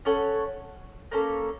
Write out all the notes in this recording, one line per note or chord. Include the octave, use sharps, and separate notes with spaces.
C#4 A4 C#5 F#5
A#3 C#4 A4